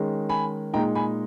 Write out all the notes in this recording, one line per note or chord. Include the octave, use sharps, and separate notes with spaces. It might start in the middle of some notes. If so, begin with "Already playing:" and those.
Already playing: D#3 G#3 C#4
G#5 B5
A#2 G#3 D#4 G5 A#5
G#5 B5